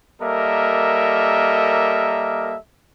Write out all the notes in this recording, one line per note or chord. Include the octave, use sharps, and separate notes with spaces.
G3 A#3 A4 A#4 D#5 E5